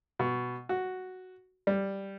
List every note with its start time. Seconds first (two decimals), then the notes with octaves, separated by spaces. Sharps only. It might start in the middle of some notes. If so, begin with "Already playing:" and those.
0.19 B2
0.69 F#4
1.67 G3